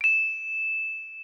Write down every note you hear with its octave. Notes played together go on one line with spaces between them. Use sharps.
D7 E7